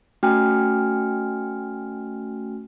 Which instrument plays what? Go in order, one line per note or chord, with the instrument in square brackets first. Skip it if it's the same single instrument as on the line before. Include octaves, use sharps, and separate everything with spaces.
[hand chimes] A3 C#4 F#4 G5 G#5 F6